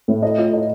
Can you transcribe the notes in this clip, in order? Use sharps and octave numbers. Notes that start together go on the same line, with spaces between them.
A2
D#5
F4
D#5